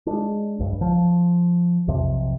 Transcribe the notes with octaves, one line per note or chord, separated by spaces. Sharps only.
G#3 D4
B1 G2
F3
B1 F2 C3